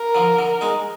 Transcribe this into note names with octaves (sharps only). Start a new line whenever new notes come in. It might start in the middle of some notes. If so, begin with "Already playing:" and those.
Already playing: A#4
D3 F3
D3
G#3 D#4